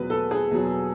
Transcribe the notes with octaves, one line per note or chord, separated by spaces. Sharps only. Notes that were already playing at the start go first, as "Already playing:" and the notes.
Already playing: E2 B2 F#3 B4
A4
G#4
E2 B2 F#3